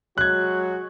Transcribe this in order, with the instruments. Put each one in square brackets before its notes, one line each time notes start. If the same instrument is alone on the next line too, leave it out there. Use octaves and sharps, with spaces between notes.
[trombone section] F#3 G#3 F#4 [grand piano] F#6 G#6